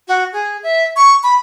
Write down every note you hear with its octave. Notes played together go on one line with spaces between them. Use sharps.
F#4
G#4
E5
C#6
B5